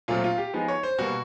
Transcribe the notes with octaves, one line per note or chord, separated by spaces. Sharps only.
A#2 F#3 A3 C4 F4
F4
G4
F3 G#3 B3 D#4
C#5
C5
B2 G3 A#3 F#4